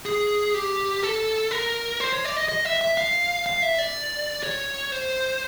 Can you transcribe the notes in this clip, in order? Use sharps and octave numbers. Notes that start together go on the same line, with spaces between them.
G#4
G4
A4
A#4
C5
C#5
D5
D#5
D#5
E5
E5
F5
F5
E5
D5
C#5
C5